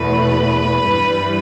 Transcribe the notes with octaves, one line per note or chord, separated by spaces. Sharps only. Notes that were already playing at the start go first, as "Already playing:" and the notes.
Already playing: E2 B2 A3 B4
G2 E3 G3